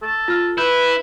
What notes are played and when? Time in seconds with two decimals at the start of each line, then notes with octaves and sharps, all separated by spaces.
0.02 A4
0.28 F4 F6
0.58 E4 B4 G6